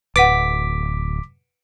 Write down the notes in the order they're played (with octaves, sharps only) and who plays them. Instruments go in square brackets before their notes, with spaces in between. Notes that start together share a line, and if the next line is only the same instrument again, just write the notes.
[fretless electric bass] D1 [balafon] B4 F#5 [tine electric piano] D6 B6